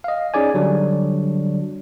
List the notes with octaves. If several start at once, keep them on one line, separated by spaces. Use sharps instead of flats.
D#5 F5
C#4 D#4 G#4 D5 G#5
D3 F#3 G3 D4